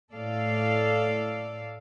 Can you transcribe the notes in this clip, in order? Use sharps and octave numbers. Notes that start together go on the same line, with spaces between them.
A2 A4 D5 F5